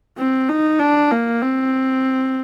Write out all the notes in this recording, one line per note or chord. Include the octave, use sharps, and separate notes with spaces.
C4
D#4
D4
A#3
C4